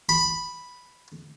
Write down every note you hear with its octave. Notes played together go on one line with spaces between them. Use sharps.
B5